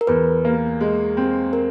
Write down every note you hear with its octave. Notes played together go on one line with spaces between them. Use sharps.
A#4
E2 B4
A#3
G#3
C4
A#4